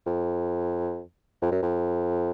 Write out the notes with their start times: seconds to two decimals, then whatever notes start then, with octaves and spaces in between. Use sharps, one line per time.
0.07 F2
1.42 F2
1.52 F#2
1.63 F2